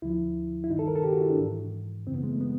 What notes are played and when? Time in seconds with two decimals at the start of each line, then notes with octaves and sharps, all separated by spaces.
0.02 D2 D3 F3 E4
0.64 E4
0.70 G2 D#3 D#4
0.79 A4
0.88 A#4
0.96 A4
1.04 G4
1.13 F#4
1.21 E4
1.30 D4
1.38 G#2 E3
2.07 F#2 C#3 E3 C4
2.15 B3
2.23 G#3
2.32 A3
2.41 B3